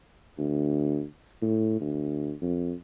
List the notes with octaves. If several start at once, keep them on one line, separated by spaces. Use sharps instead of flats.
D2
A2
D2
F2